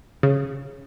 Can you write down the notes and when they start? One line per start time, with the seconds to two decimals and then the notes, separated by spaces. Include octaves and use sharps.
0.23 C#3